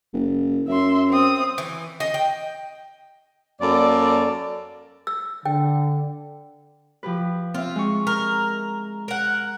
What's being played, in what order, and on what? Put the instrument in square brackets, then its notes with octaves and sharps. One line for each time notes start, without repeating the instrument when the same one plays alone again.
[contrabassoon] F#1
[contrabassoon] F#2 [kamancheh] E5 C6
[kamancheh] C4 D#6
[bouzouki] E3
D#5
G5
[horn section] F#2 A#3 A4 D5
[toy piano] E6
[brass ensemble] D3 [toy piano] G5
[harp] F3 G4 B4
[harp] C4 E5 [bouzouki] F4
[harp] G#3 C#6
[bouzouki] A#4
A#4 F#5